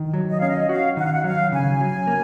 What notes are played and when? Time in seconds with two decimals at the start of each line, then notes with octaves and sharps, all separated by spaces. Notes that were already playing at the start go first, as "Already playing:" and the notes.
Already playing: D#3
0.14 F#3
0.28 D#5
0.38 F5
0.42 C#4
0.47 D#5
0.69 F#4 F5
0.97 D#3 F#5
1.05 F5
1.11 F#5
1.24 F#3 F5
1.52 C#3 G#5
1.80 F#3
2.07 A#3